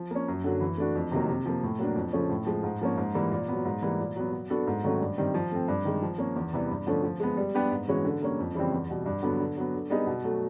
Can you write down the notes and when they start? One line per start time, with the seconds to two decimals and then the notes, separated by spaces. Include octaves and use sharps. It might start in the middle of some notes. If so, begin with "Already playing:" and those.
Already playing: F3
0.11 A#3 C#4
0.28 F#2
0.44 D3 F#3 A#3
0.61 E3
0.78 A3 D4 F#4
0.95 F2
1.12 C3 D#3 F#3 A#3
1.28 C3
1.46 F3 A#3
1.63 A2
1.79 F#3 A#3 D4
1.96 F2
2.13 C#3 F3 A3 C#4
2.30 A2
2.46 F3 G#3
2.63 G#2
2.81 F3 A#3 C#4
2.98 G#2
3.15 E3 G3 A#3
3.31 A#2
3.48 F#3 B3
3.65 G#2
3.82 E3 G3 A#3
3.99 A#2
4.16 F#3 B3
4.33 F#3
4.50 B3 D4 F#4 A4
4.67 G#2
4.84 D#3 F#3 A3 C#4
5.01 G2
5.18 D#3 G3 C4
5.34 F3
5.52 A3 C4
5.68 G2
5.85 D#3 G#3
6.02 F3
6.18 A#3 C#4
6.36 E2
6.53 C3 E3 G3 B3
6.70 G2
6.87 D3 F3 A3 C#4
7.04 F3
7.20 G#3 B3
7.37 G3
7.54 B3 D4 G4 B4
7.71 G#2
7.88 E3 G#3 C#4 F#4
8.05 D3
8.22 G3 A#3 C#4
8.39 F2
8.55 C#3 E3 G3 C4
8.72 E2
8.89 B2 G3
9.06 G2
9.22 D3 F#3 B3
9.40 D3
9.57 F#3 B3
9.74 D3
9.90 G3 B3 D#4 G#4
10.07 B2
10.24 F#3 A3